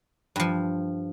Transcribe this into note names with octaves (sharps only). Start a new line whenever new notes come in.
G2 F3